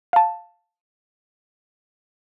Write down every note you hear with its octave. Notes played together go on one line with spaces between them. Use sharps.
F5 A5